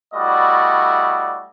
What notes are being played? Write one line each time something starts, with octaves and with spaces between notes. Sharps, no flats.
G3 A3 E4 F#4 D5 D#5